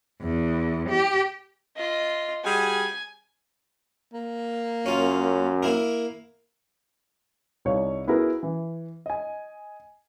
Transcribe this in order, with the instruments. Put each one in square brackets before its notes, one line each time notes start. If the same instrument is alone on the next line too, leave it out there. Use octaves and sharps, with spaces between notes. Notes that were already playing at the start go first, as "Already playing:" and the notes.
[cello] E2
G4
[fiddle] F4 D#5
[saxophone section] G3 F#4 G#4 [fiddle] G#5
[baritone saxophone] A#3
[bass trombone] F#2 [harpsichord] C#4 F4
[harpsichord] A#3 E4 A#4
[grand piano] C2 D#4 C#5 F5
B3 E4 F#4 G#4 A#4 B4
E3
D#5 G#5